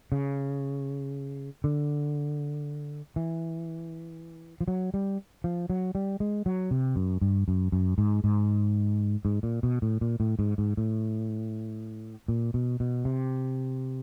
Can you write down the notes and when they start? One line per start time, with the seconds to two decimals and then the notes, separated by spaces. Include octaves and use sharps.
0.12 C#3
1.64 D3
3.16 E3
4.61 F3
4.68 F#3
4.94 G3
5.44 F3
5.70 F#3
5.95 G3
6.20 G#3
6.46 F#3
6.71 C3
6.96 F#2
7.21 G2
7.48 F#2
7.72 F#2
7.98 G#2
8.24 G#2
9.25 G#2
9.43 A#2
9.63 B2
9.82 A2
10.01 A#2
10.20 A2
10.39 G#2
10.58 G#2
10.77 A2
12.28 A#2
12.54 B2
12.80 B2
13.05 C3